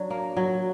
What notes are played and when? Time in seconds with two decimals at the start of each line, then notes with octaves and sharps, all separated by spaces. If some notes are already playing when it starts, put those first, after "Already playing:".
Already playing: F#3 D4
0.10 A#3
0.37 F#3